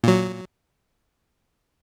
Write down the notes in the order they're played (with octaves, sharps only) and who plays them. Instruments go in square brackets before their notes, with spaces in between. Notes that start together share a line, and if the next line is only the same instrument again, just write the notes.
[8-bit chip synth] A#2 F#3